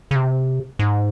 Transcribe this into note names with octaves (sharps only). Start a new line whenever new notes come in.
C#3
C3
G#2